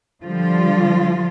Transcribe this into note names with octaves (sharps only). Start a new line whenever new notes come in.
D3 F3 G3 F4